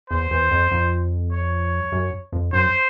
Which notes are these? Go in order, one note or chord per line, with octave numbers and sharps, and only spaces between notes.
E2 C5
E2
F2
F2
C#5
F#2
F2
F#2 C5